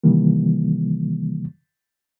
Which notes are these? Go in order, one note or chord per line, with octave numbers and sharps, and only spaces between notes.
C3 D#3 E3 G3 A#3